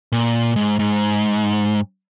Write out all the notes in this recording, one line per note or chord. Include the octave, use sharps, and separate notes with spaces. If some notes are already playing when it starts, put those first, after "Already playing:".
A#2
G#2
G#2